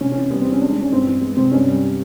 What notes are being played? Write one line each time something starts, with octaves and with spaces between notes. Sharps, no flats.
C3 C#4
E3 C#4
G3 B3
E2 C4
C#4
G#3 D4
G#3 D4
C#4
G2 C4
E3
G#3 B3
C3 C4
G2 C#4
G3